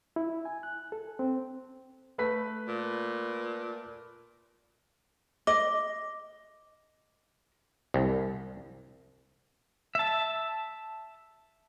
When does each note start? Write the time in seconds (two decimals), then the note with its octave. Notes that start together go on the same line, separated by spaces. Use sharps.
0.16 E4
0.45 G#5
0.63 F#6
0.92 A4
1.19 C4
2.18 A3 B4 B6
2.68 A#2
5.47 D#5 D6
7.94 C2
9.95 E5 A5